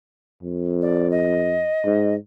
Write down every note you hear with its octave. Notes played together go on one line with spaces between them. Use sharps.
F2
D5
D#5
G#2